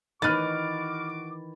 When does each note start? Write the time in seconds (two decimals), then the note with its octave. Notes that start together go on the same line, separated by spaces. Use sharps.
0.22 D#3 E3 F#4 B4 D6 F6 A6